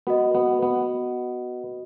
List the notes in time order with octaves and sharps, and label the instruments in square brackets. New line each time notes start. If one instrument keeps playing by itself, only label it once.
[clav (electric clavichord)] B3 [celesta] F#4 B4 D#5
[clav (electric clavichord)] B3
B3